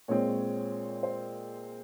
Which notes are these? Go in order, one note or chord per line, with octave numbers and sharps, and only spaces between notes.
A#2 G#3 C4 C#5
C5